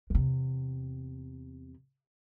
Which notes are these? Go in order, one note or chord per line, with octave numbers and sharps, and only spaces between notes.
E2 C3